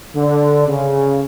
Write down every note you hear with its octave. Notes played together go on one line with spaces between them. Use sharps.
D3
C#3